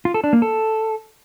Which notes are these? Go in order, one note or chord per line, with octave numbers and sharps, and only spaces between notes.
F4
A4
D4
A#3
A4